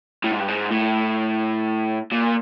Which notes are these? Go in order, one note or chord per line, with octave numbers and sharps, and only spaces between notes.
A2
G#2
G2
G#2
A2
A#2